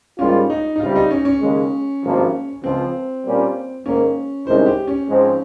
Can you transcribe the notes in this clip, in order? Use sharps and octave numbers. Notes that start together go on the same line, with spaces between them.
G#2 G3 A#3 C#4 F4
D#4
D#4
C#2 C3 G3 F4
D#4
C#4
C#4
D#2 C#3 G#3
G#1 G2 F3 A#3
C#2 C#3 F3 C4
A#2 G3 A#3 C#4 F4
G#2 D#3 A#3 C#4
C2 C3 D#3 G#3 C#4 C5
G4
C#4
G#2 F3 G#3 C4